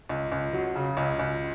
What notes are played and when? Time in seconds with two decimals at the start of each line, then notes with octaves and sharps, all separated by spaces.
0.09 C#2
0.32 C#2
0.53 F#3
0.76 C#3
0.97 C#2
1.19 C#2